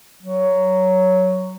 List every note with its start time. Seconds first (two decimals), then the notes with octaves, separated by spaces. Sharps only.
0.23 F#3